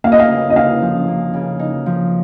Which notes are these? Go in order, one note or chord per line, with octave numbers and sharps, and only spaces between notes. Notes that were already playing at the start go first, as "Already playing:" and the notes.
A#3 F5
D#5
F5
C#3
D#5
D#4 F5
F3
A#3
C#3
D#4
F3